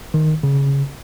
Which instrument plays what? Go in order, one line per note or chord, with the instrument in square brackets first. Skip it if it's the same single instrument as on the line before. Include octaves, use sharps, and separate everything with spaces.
[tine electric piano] D#3
C#3